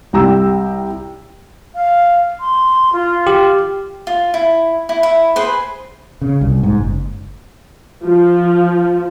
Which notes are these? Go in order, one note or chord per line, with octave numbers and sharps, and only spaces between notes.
C2 G3 G5 A#5 E6
F5
C6
F4
G4
F4
E4
E4
E4
G#4 B4 C5
C#3
C2
G#2
F#1
F3